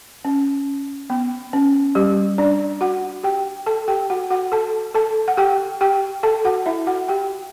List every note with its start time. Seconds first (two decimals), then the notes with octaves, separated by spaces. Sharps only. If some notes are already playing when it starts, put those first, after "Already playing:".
0.25 C#4
1.10 B3
1.53 C#4
1.95 G3 G4
2.38 D4 D5
2.81 F#4 F#5
3.23 G4 G5
3.66 A4 A5
3.88 G4 G5
4.10 F#4 F#5
4.30 F#4 F#5
4.52 A4 A5
4.94 A4 A5
5.28 F#5
5.37 G4 G5
5.81 G4 G5
6.23 A4 A5
6.45 F#4 F#5
6.66 E4 E5
6.87 F#4 F#5
7.08 G4 G5